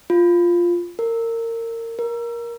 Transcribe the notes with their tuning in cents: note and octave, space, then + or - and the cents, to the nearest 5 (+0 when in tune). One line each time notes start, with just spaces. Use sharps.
F4 -5
A#4 -25
A#4 +15